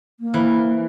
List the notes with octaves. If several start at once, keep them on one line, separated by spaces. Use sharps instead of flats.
A#3
E3 E4 C5 B5